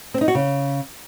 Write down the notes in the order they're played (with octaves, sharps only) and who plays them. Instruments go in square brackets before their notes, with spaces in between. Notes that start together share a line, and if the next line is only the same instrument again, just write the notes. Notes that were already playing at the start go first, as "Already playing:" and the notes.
[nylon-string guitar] C4
D#4
F#4
C#3